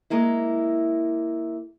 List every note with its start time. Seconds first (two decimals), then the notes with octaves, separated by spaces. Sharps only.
0.10 G#3 A#3 E4